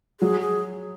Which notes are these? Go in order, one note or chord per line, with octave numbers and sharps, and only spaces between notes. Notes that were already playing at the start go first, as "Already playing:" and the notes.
F#3 G#4
G#4